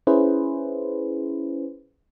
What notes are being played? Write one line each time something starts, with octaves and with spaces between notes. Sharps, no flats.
C#4 E4 G#4 B4 C5